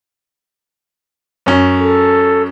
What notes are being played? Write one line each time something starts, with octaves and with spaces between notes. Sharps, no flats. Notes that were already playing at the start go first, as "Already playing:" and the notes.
F#2 C#4
A4